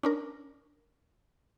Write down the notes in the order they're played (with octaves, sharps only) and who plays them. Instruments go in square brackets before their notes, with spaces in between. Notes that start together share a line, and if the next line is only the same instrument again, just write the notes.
[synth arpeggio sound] C#4 D4 A#4